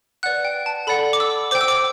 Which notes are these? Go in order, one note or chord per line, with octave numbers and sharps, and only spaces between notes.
B4 D5 F#5 F#6
G5
A5
A4 D5 F#5 B5
D6
E6
C5 G5 D6
E6
D6